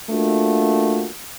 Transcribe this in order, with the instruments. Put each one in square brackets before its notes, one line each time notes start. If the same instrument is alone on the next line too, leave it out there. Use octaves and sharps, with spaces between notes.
[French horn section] A3 A#3 D4 F4 F#4